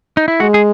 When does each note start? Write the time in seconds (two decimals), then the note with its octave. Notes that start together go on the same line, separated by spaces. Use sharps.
0.17 D#4
0.28 E4
0.40 G#3 F#4
0.54 G#4